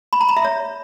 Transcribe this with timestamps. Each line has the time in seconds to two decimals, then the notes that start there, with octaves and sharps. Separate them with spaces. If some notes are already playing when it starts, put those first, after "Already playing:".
0.13 B5
0.21 A#5
0.29 B5
0.37 E5
0.45 C#5